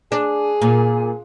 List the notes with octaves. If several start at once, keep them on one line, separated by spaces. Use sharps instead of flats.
D4 G#4
A#2